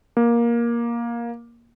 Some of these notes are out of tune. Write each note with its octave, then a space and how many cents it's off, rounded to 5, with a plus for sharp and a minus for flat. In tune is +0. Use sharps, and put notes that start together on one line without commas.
A#3 +15